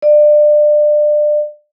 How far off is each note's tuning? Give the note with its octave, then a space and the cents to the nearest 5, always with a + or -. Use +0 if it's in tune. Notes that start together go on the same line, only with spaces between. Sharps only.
D5 +30